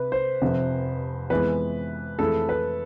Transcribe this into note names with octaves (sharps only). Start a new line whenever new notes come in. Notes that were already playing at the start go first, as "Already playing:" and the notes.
Already playing: C3 B4
C5
F1 F2 C3
F2 E3 G#3 B3 B4
F2 E3 A3 E4 G#4 A4
B4